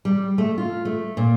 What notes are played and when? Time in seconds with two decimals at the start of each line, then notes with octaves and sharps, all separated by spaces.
0.05 G3
0.38 A3
0.58 F4
0.85 A3
1.17 A#2